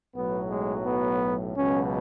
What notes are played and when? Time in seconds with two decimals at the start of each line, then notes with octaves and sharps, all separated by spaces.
0.15 B1 A2 F#3 B3
0.50 G#3
0.86 B3
1.57 C#2 B2 F#3 C#4